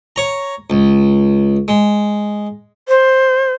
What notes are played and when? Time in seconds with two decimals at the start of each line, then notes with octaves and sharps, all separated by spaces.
0.16 C#5 A#5
0.70 C#2
1.68 G#3
2.89 C5